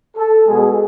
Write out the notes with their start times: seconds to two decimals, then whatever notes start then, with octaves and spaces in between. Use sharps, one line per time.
0.17 A4
0.46 B2 G#3 G#4